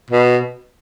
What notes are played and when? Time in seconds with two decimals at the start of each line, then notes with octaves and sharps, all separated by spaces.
0.11 B2